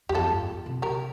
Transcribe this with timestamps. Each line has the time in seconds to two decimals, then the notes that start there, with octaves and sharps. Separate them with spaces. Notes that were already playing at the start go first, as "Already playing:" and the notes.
0.09 E2 G4
0.15 F2 F4 A4
0.31 G2
0.66 C3
0.82 C3 G4 A#4